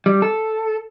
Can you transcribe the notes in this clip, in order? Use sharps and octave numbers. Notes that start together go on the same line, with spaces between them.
G3
A4